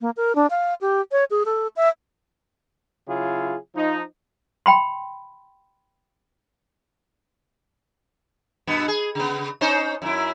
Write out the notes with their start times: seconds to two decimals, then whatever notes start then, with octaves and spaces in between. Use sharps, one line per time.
0.01 A#3
0.17 A#4
0.35 D4
0.50 F5
0.81 G4
1.12 C#5
1.31 G#4
1.45 A4
1.76 E5
3.08 C#3 F#3 E4 F4 G#4
3.76 F3 D#4
4.66 G5 B5 C6
8.67 G2 B2 B3
8.88 G#4
9.15 C#3 B3
9.61 C#4 D#4 C5
10.02 F#2 E4